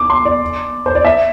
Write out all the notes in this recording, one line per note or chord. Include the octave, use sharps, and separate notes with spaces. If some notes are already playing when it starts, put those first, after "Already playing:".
Already playing: D6
C6
D5
C5
D5
E5